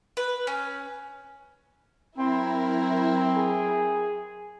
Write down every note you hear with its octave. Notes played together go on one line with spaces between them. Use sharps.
B4
C#4
F#3 C4 E4 A#4
G#4